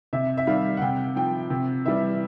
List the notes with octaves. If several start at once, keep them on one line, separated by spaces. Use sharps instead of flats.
C3 E5
E5
D#3 G3 F5
F#5
C3 G5
F3 G5
C3
E3 G3 E5